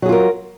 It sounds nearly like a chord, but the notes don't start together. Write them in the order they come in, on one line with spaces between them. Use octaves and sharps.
F#3 G#4 F4 A#4